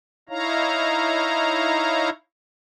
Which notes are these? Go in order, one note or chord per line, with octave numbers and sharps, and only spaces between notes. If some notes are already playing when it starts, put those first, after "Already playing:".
D#4 E4 C#5 F5 A#5